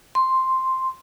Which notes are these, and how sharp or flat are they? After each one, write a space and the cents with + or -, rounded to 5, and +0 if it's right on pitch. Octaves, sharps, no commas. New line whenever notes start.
C6 +0